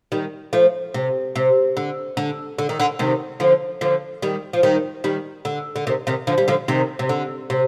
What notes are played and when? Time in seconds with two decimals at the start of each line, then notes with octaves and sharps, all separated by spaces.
0.12 D#3 G3
0.53 F3 A3
0.94 C3
1.35 C3
1.77 D3
2.17 D3
2.58 D3
2.69 D#3
2.80 D3
2.99 C3 D#3
3.40 D3 F3
3.81 D3 F3
4.22 D#3 G3
4.53 F3
4.63 D#3 G3
5.04 D#3 G3
5.45 D3
5.76 D3
5.87 C3 D#3
6.07 C3 D#3
6.27 D3 F3
6.38 G3
6.48 D3 F3
6.68 C3 D#3
6.99 C3
7.09 D3
7.50 C3